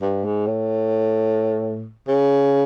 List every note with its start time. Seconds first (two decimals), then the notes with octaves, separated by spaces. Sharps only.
0.02 G2
0.25 G#2
0.47 A2
2.08 C#3